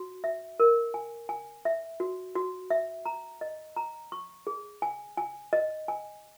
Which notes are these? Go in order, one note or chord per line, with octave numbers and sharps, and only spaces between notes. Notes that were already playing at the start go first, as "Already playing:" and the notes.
Already playing: F#4
E5
A#4
G#5
G#5
E5
F#4
F#4
E5
A#5
D#5
A#5
C#6
G#4
G#5
G#5
D#5
G#5